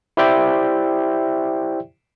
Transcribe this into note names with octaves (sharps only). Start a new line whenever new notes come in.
E4 G4 C5 D5 E5 G5